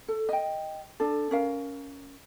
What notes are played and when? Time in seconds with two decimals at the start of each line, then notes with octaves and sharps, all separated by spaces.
0.08 A4
0.29 D#5 G5
1.00 D4 A4
1.31 C#4 A#4 F5